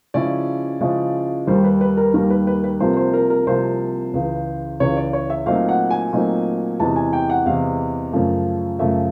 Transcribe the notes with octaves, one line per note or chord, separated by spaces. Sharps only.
C#3 F3 G#3 C#4 E4 D5
C#3 F3 G#3 C#4 E4
D#2 D#3 G3 A#3 C5
B4
B4
A#4
D#2 D#3 G3 A#3 A#4
B4
B4
B4
C2 C3 F3 A#3 C5
C5
A#4
A#4
C2 C3 F3 A#3 C5
C#2 C#3 E3
C#2 C#3 E3 C#5
D5
C#5
E5
A#2 F#3 A3 C4 D#4 F5
F#5
G#5
A#2 F#3 A3 C4 D#4
E2 C3 E3 G#3 A5
G#5
G5
F#5
E2 C3 E3 G#3 F5
F#2 C#3 F3 A3
F#2 C#3 F3 A3 E5